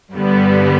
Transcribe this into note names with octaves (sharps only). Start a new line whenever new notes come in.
G2 D3 G3 B3